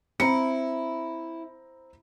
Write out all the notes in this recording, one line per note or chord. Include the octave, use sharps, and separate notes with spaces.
C4 E4 A#5 C#7